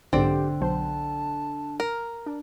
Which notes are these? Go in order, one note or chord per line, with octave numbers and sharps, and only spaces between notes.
B1 G#2 D3 C4 G4 D5
B1 F#3 C5 A5
A#4
D4